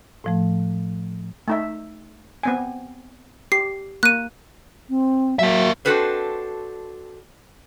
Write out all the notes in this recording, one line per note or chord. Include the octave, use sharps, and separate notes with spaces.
A2 F3 A3
A3 D#4 E5
B3 C4 G#5
G4 C7
A#3 F#6 D#7
C4
F#3 A#3 E5
C4 D4 F#4 A4 B4 C5